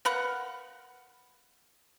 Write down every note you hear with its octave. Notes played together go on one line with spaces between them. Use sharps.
A#4 B4 F5 F#5